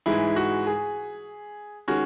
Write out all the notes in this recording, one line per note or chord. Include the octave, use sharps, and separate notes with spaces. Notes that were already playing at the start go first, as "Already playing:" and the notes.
G#2 E3 G#3 E4
F#4
G#4
D#3 G#3 C#4 F#4